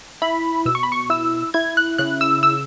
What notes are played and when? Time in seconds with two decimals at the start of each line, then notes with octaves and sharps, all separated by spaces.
0.22 E4 B5
0.66 B2 E6
0.75 C#6
0.83 B5
0.92 C#6
1.10 E4 E6
1.54 E4 G#6
1.77 F#6
1.98 C#3 F#6
2.21 E6
2.43 E6